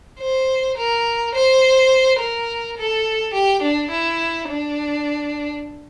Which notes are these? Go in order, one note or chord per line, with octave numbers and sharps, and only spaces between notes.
C5
A#4
C5
A#4
A4
G4
D4
E4
D4